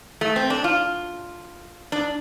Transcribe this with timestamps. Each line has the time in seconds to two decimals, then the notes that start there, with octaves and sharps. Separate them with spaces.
0.21 A3
0.36 C4
0.50 D4
0.64 F4
1.92 D4